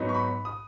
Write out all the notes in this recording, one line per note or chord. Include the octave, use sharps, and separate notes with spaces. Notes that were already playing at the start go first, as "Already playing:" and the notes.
Already playing: G#2 F#3 B3 D#4
C#6
B5
D#6